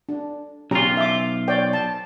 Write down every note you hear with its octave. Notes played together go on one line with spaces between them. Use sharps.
D4
B1 C#4 F4 G4 A#5
E5 D6
C#5 D5 G5
A5